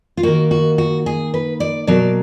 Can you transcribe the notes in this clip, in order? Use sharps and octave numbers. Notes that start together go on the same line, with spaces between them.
F4
D#3 A#3 D#4 F#4
F#4
F#4
G#4
B4
D5
B2 F#3 A#3 D5